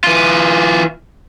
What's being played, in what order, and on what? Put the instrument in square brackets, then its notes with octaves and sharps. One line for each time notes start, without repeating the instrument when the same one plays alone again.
[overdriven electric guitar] E3 F4